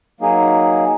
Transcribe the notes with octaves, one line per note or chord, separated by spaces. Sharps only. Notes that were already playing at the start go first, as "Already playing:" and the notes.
F#3 A#3 D#4 G#4